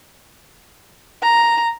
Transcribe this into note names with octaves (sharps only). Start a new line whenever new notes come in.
A#5